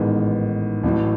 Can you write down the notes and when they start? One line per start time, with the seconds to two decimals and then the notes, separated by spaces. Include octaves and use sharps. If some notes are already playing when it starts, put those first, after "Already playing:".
Already playing: A1 G#2 D#3 G#3 B3
0.84 A1 A2 F#3